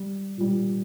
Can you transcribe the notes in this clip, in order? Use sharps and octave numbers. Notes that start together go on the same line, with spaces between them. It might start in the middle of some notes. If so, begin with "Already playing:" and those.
Already playing: G3
A#2 G3